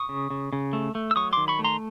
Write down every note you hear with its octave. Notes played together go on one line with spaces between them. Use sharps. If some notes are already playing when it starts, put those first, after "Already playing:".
Already playing: C#6 D#6
C#3
C#3
C#3
A3
A3
E6
F#3 C#6 D#6
D#3 C6 D6
B5 C#6
A3
A#5 C6